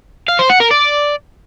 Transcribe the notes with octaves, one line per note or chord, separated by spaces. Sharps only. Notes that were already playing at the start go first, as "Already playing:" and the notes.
F5
C5
F#5
A#4
D5